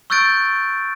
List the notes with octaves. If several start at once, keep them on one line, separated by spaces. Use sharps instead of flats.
C#6 E6 F#6 G6 A6 D7